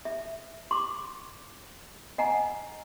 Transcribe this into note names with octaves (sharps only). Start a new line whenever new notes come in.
E5
C6 D6
D#5 F#5 G#5 A#5